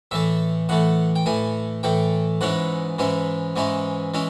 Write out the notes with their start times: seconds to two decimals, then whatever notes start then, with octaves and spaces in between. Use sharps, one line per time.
0.11 A2 E3 A3 E5
0.69 A2 E3 A3 F#5
1.16 G5
1.26 A2 E3 A3 G#5
1.83 A2 E3 A3 G5
2.41 G#2 E3 G#3 C#4 E4 F#5
2.99 G#2 E3 G#3 C#4 E4
3.56 G#2 E3 G#3 C#4 E4
4.14 E3 G#3 C#4 E4